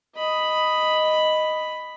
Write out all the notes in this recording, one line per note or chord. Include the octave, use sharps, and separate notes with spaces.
D#5 B5